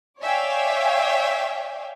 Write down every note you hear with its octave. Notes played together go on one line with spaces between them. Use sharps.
C#5 D5 E5 F5 G5 G#5